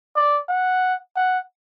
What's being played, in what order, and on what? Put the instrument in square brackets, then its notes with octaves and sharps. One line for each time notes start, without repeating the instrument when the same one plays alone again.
[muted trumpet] D5
F#5
F#5